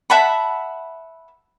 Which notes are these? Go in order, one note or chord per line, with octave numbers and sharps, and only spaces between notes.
E5 F#5 A5 B5